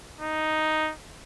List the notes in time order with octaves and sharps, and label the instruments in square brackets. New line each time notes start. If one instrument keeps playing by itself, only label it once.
[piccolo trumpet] D#4